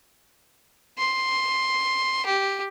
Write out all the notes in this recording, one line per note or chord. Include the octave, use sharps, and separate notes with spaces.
C6
G4